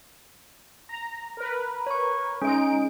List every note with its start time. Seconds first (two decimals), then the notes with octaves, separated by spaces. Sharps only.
0.89 A#5
1.37 A#4 B4
1.87 C#5 C#6
2.42 G#3 C#4 D#4 D7